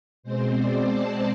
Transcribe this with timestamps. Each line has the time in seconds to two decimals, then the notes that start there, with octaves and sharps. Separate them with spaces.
0.23 B2 G#3 C4 C5
0.54 D5
0.86 A5